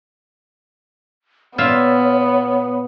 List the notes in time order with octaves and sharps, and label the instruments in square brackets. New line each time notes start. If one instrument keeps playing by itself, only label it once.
[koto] A#2 F4 E5 [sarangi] B3 [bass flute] C#5